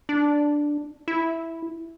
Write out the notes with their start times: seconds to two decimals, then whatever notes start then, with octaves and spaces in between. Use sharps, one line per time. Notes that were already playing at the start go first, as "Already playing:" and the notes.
0.09 D4
1.08 E4